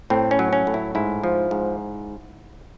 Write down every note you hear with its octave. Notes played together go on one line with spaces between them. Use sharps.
A2 C4
C#4
F#3
C#4
A2
E4
G#2 E4
F3
G#2